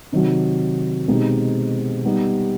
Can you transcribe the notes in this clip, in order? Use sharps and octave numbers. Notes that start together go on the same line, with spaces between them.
C3 D#3 F#3
B2 G#3 C4 D#4 G4
G3 B3 D#4 G4